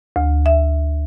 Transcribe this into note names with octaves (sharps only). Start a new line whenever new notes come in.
D2
E5